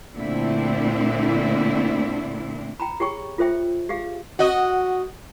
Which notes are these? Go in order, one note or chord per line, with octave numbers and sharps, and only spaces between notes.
A#2 D3 A3 C4 D4 E4
G5 A#5 B5
G4 G#4 C#5 G5 C#6
F4 A4 C5 E5 G5
G4 G#4 F5
F#4 D#5